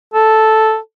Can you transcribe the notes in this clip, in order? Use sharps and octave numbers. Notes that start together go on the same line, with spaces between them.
A4